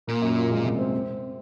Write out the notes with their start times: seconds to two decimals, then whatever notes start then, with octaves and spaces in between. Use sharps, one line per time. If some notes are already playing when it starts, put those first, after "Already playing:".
0.07 A#2 A#3
0.22 F#2
0.36 F4
0.51 G#3
0.64 C3
0.79 C4
0.93 C4